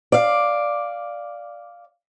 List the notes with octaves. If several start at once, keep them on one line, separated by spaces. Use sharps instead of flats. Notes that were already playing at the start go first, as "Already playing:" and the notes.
D5 F5